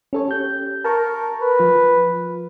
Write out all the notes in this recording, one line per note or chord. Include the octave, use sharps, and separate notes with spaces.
C#4 A4 C#5
G4 G6
A#4 A5 A#5 C#6
B4
F3 F4